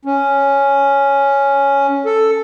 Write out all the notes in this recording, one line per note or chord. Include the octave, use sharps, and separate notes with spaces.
C#4
A4